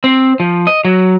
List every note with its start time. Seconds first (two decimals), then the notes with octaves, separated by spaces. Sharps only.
0.04 C4
0.40 F3
0.67 D#5
0.85 F#3